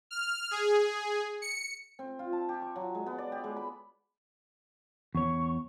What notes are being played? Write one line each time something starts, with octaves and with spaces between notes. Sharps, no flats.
F6
G#4
C#7
C4
F4
A5
G4
C#6
F#3
G#3
B3
D5
G4
G#3
B5
E2 C#5 C#6